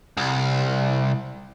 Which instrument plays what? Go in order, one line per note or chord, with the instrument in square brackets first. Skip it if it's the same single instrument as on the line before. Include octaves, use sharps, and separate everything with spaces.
[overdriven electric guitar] C2